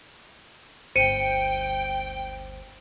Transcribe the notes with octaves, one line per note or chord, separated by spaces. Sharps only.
G1 D2 C5 G5 C#7 D#7